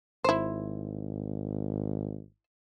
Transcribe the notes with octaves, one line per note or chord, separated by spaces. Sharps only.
G#1 E4 C5